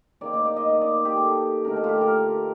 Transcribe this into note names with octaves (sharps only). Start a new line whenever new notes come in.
D#3 A#3 D#4 D5
D5
D5
D#5
D#5
D5
G4
A4
D3 A3 D#4 A#4
A4
F4 G4
A#4